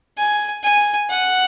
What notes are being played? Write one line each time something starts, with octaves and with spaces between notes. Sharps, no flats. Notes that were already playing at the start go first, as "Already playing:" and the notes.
G#5
G#5
F#5